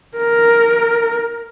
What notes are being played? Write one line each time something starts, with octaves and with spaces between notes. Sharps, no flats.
A#4